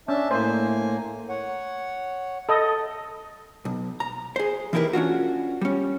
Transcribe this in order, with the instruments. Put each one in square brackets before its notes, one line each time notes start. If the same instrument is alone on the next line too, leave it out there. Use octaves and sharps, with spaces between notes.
[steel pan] C#4 [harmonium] D4 E5 A5
[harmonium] A2 A#3 G#5 [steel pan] C5
[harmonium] C#5 F#5
[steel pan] A4 D#5
[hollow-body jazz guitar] B1
A#5
G#4 C5
E3 D#4 E4 G4 A#4 B4
C#4 D4 F4 F#4
G3 C#4